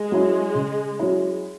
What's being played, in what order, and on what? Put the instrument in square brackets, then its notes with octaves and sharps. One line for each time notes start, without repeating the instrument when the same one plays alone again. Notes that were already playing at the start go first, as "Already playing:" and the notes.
Already playing: [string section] G#3
[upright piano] F#3 C#4 E4
C#3
F#3 C#4 E4